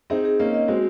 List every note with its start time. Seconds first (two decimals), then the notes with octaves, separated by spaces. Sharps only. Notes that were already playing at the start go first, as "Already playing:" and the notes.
0.10 C4 D#4 G#4
0.25 G#4
0.40 A#3 C#4 D#5
0.54 D#5
0.68 G#3 C4 F#4